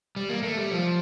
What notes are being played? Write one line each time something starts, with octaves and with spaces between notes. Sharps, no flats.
G3
A#3
A3
G3
F3